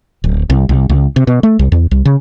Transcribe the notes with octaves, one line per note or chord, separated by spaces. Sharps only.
D1
C2
C2
C#2
C3
B2
A3
C2
E2
C2
C#3